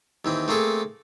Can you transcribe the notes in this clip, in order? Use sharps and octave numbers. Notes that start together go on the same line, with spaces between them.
D#2 E3 C4
A3 A#3 C4 G#4 A4